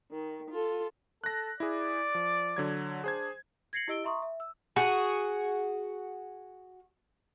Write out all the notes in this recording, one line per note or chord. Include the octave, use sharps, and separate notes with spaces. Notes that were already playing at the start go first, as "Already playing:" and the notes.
D#3
F4 A4
A4 F#6 A#6
E4 G#4 D5
F3
D3 F#3 G#6
D4 G#4 C5 G#6
G#6 A#6 C7 C#7 F#7
E4 G4 D#5 E6 D7 G7
E5 A#5 C6 C#6 D#6
E5
E6
F#4 G#4